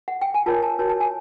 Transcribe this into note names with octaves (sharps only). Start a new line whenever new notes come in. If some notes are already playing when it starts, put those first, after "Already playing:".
F#5
G5
G#5
F4 A#4 C#5 A5
A5
F#4 A#4 C#5 A5
A5
G#5